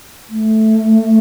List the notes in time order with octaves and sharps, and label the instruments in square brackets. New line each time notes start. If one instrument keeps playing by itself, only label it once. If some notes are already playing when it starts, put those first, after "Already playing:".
[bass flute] A3